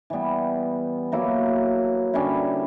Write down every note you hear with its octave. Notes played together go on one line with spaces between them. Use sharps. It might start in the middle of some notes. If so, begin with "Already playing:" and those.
E3 G3 B3
F#3 A#3 E4 A#4
D3 G3 C#4 E4